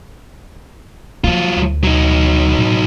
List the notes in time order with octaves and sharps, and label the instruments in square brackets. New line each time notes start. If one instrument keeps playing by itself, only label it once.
[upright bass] F3 A#3 [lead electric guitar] F#3 F4
[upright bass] D2
[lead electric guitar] F#3 D#4
[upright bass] A2